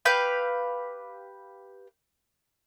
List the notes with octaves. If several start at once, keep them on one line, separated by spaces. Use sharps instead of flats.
G4 B4 F5 G6